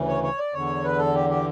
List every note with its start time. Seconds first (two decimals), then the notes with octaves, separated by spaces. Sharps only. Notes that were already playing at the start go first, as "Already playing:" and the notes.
Already playing: D2 C#3 E3
0.08 C#5
0.23 C#5
0.38 D5
0.54 E2 D3 C#5
0.84 B4
0.99 A4
1.15 G4
1.30 G4